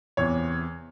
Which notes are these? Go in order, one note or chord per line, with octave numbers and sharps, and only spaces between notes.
E2 C3 E3 C#5